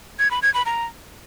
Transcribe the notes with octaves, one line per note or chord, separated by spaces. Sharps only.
G#6
B5
G#6
B5
A#5